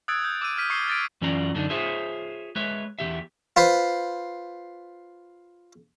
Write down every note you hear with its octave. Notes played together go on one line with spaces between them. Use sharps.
D#6 E6 F#6 G#6 A6 D7
F#6 G6
D6 E6 D#7
F6 B6 D#7
C#6 D#6 C7 C#7 G7
G#6 A6 D7
F#2 E3 C#4 F4 D5 A#5
F#2 D3 D4 D#4
F4 G#4 C5 C#5 E5
G#3 B4 C#5 E5
E2 D#3 G4 E5
F4 B4 C5